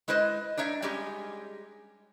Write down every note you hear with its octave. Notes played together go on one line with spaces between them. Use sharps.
G#3 E4 B4 C5 D#5
D4 D#4 C#5 E5
G3 G#3 C#4 D#4 G4